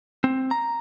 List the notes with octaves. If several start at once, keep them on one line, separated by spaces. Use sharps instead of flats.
C4
A#5